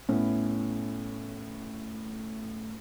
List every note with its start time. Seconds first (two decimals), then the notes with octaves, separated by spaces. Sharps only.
0.09 A2 B3 C#4 E4